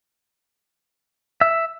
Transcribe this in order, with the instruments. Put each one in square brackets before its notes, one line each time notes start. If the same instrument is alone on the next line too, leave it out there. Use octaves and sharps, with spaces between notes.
[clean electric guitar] E5